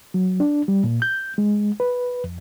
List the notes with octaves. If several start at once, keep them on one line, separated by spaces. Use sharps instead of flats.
F#3
D4
G3
A#2
G6
G#3
B4
F2